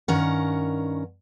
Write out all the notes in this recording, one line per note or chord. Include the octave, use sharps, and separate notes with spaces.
G2 D#3 C#4 A#4 F#5